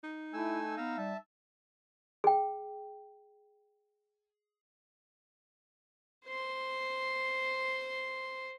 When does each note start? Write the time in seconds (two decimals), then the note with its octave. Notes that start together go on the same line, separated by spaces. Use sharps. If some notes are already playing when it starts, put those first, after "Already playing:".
0.04 D#4
0.33 A3 E4 G#5 E6
0.77 B3 F5 A#5 E6
0.97 G3 E5 A5
2.24 G#4 G5
6.27 C5 C6